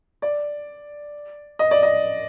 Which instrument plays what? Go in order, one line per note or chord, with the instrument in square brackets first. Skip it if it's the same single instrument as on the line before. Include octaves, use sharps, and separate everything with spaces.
[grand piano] D5
D#5
D5
D#5